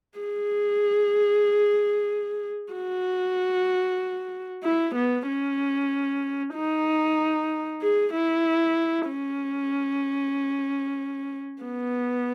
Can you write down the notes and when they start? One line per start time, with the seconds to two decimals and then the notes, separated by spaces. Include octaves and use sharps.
0.19 G#4
2.74 F#4
4.64 E4
4.95 B3
5.28 C#4
6.54 D#4
7.82 G#4
8.13 E4
9.08 C#4
11.63 B3